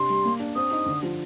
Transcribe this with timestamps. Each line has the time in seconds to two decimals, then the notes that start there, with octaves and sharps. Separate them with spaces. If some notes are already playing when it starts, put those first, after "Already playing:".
Already playing: C3 D4 C6
0.10 G3
0.25 A#3
0.40 D4
0.56 C4 D#6
0.71 D#4
0.86 D3
1.03 F3